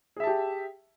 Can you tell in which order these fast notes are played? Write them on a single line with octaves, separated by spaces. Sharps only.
G#4 E5 A5 G4